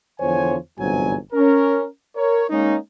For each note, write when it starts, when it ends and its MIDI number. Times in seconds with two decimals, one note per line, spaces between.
0.20 0.56 40
0.20 0.56 50
0.20 0.56 53
0.20 0.56 72
0.20 0.56 73
0.20 0.56 80
0.79 1.15 31
0.79 1.15 40
0.79 1.15 44
0.79 1.15 48
0.79 1.15 54
0.79 1.15 80
1.33 1.84 61
1.33 1.84 70
2.15 2.44 70
2.15 2.44 73
2.50 2.75 56
2.50 2.75 58
2.50 2.75 61
2.50 2.75 63